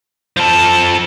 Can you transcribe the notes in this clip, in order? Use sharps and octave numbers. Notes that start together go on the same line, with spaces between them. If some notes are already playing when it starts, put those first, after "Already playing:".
F3 A4